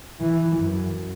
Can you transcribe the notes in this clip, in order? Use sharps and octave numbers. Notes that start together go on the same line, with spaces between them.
E3
F#2